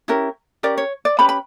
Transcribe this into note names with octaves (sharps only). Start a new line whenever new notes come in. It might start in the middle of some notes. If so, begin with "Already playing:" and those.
C#4 E4 G4 A#4
C#4 G4 A#4 D5
C#5
D5
C#4 G4 B4 B5
B5